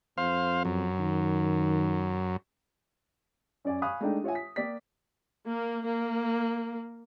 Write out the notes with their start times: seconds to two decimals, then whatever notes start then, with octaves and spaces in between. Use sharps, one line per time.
0.18 F2 C5 F5
0.65 F#2
0.99 D#3
3.65 F#2 D5 G#5
3.82 F5 G#5 B5 C#6 D#6 F#6
4.01 G#3 A3 D4 D#4 G5
4.24 F4 C#5 E5 G#5
4.35 B6
4.56 A#3 D5 G5 B6
5.49 A#3
5.86 A#3